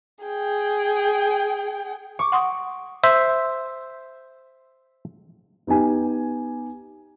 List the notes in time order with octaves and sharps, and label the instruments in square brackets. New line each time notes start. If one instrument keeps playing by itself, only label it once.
[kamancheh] G#4 G5
[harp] C#6 D6
[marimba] F#5 C6 D#6
[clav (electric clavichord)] C5 E5
[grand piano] B3 D#4 G4 G#5